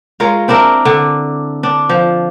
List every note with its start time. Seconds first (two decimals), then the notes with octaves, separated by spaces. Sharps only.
0.20 G#3 F4 A#4 C#5
0.48 C4 D4 E4 A#4
0.85 D3
1.63 D4
1.89 F3